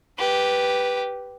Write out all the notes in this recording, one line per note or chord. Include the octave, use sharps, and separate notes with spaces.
G4 B4